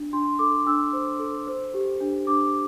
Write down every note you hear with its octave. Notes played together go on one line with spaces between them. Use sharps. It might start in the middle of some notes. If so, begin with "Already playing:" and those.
Already playing: D4
D4 C6
A4 D6
D4 E6
C5
A4
C5
G4
D4
D4 D6